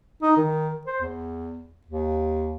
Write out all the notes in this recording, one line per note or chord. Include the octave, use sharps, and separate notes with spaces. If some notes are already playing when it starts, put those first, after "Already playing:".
D#4
D#3
C5
E2
D#2